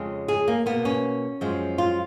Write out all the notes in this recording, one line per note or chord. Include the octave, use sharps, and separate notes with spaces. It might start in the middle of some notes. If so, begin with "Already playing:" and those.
Already playing: F2 C#3 G#3
G#4
A#3
B2 A#3 B3
C#4
F#2 F3 G#3
F4